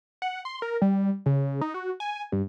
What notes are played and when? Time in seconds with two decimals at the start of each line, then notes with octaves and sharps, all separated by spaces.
0.22 F#5
0.45 C6
0.62 A#4
0.82 G3
1.26 C#3
1.61 D#4
1.74 F#4
2.00 G#5
2.32 G2